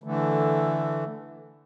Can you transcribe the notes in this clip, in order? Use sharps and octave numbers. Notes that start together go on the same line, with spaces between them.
D3 E3 A3